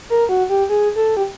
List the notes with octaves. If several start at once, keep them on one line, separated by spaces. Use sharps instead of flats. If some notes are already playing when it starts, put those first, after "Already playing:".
A#4
F#4
G4
G#4
A4
G4